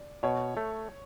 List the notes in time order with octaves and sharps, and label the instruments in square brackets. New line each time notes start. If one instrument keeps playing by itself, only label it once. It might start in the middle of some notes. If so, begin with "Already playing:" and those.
Already playing: [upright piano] D5
[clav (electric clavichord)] B2 [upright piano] C#5
[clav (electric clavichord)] A3